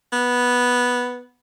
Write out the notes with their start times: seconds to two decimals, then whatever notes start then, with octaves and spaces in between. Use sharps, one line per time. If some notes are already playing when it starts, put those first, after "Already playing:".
0.13 B3